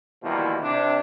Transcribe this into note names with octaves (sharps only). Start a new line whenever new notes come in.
D#2 B2 E3 F3 G3 E4
C3 D4